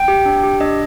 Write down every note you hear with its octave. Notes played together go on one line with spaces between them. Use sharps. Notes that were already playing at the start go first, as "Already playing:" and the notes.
Already playing: G5
G4
D4
G4
D4 D#5